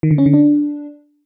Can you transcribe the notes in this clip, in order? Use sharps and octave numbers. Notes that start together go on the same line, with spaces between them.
D#3
D3
C#4
D3
D4